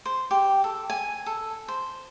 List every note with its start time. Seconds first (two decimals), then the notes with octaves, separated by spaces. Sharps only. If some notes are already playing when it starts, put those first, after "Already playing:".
0.06 C5
0.31 G4
0.64 A4
0.90 G#5
1.26 A4
1.68 C5